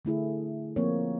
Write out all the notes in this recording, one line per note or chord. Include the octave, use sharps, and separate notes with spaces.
D3 A3 E4 G#4
F3 A#3 C4 C#5